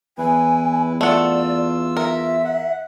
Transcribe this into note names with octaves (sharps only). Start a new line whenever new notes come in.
E2 E4 B4 G#5
A3 F4 D5 F#5 E6
A#4 E5
F#5